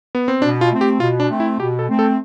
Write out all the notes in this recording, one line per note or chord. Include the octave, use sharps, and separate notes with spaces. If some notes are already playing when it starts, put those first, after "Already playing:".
B3
C4
B2 D4
F4
A3 C4
G4
B2 F4
D4
A3 C4
E4
B2 G4
A4
A3 C4
A4